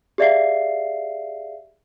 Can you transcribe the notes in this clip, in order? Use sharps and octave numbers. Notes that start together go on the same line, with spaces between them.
G4 G#4 D5 E5 F5 C7